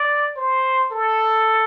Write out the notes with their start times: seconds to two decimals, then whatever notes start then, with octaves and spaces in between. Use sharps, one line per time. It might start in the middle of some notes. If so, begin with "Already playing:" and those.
Already playing: D5
0.36 C5
0.92 A4